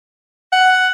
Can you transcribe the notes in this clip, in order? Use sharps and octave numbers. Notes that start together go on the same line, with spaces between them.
F#5